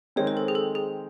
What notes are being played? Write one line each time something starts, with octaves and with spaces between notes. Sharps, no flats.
D#3 G#3 C4 C#5
C5
A4
G#4
A4
G#4